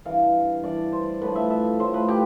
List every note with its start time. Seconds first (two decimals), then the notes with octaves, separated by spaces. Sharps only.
0.05 G2 E3 F5
0.64 G2 E3 D5
0.92 C5
1.21 A2 F3 B4
1.36 E5
1.50 E5
1.80 A2 F3 C5
1.94 B4
2.09 G4